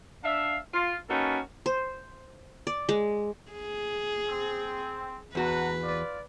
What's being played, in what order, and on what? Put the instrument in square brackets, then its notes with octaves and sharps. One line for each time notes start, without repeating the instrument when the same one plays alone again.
[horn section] D4 E5 F5
F4
A#3 C#4 D#4 F#4 A4 B4
[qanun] C5
D5
G#3
[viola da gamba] G#4
[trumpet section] C4
[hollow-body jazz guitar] E2 F#4 [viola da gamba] B4 [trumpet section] F#5 A5 A#5
[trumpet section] F4 D5